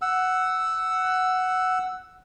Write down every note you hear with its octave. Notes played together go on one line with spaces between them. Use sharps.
F#5 E6